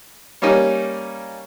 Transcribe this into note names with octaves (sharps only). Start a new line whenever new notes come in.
G3 A#3 C#4 D#4